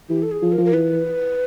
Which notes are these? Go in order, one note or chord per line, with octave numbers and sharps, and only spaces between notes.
E3 G4
A4
G#4
F3
A#4
F3
A#4
E3 B4